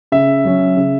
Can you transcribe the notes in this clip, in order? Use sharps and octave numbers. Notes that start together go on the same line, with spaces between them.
C#3 E5
F#3 C#4
C#3